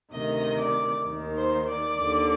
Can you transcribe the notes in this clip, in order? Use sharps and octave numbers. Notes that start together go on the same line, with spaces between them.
D2 C3 D#3 D#5
D5
D#2 D#3
C5
D5
D#2 D3